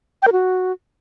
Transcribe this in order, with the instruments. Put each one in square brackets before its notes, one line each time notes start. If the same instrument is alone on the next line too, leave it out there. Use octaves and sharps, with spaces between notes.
[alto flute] G5
A#4
F#4